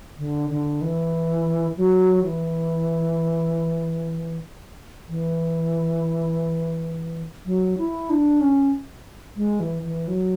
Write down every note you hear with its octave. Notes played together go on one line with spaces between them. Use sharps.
D3
D3
E3
F#3
E3
E3
F#3
E4
D4
C#4
G#3
E3
E3
F#3